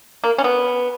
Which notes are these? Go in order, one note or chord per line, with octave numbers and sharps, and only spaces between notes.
A#3
C#4
B3